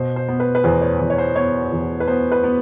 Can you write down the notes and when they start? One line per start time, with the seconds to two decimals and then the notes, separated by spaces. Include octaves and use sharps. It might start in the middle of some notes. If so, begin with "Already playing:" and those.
Already playing: B2 C5
0.16 C5
0.28 B3
0.40 B4
0.55 B4
0.64 E2 C5
0.81 C#5
1.00 E2
1.10 C#5
1.18 C5
1.35 B3 C#5
1.72 E2
2.00 B4
2.07 B3 C5
2.32 B4
2.44 B3